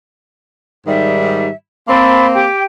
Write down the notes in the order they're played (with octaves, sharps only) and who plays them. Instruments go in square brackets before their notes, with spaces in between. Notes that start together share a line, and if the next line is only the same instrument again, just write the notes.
[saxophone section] G#2 D#3 G3 [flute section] E5
[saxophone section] A#3 C4 [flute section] A5 B5 C6
[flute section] G4 G5 D6